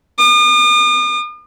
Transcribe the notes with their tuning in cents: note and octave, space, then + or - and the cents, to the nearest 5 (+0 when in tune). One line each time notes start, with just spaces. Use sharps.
D#6 -45